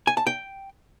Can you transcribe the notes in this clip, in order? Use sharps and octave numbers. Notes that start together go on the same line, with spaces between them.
G#5
A5
G5